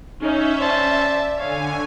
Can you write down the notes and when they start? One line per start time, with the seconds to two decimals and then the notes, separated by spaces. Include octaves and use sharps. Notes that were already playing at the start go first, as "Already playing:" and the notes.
0.21 C#4 D#4 E5
0.60 C5 D5 A5
1.38 D3 C#5 F5 G#5